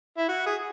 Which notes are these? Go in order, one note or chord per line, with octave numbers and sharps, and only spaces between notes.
E4
F#4
G#4